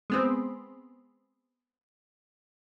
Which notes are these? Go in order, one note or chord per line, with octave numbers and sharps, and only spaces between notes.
G#3 B3 C4